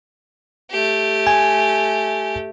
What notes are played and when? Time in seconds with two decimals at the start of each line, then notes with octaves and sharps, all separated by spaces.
0.70 A3 G4
1.27 G#5